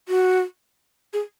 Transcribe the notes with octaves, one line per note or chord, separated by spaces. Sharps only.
F#4
G#4